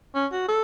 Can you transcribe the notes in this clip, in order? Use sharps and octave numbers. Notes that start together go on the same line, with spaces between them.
C#4
F#4
A4